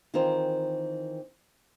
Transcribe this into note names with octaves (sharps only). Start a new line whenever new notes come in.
D#3 E3 C4 F4 A#4 C5